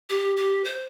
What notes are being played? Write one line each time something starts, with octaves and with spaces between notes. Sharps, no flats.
G4
G4
C5